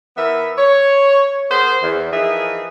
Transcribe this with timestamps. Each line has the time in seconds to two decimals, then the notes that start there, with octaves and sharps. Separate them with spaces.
0.17 E3 B3 A#4 B4 E5
0.58 C#5
1.50 B3 G#4 A#4 C5
1.82 E2
2.13 E3 F3 D#4 G#4 A#4 E5